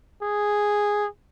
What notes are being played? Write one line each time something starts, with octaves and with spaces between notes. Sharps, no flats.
G#4